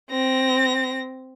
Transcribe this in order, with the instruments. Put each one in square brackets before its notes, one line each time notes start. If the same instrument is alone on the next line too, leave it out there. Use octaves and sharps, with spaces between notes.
[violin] C4 A#6